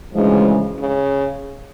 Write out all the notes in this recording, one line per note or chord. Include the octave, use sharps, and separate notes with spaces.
D2 C#3 E3 F3 G#3
C#3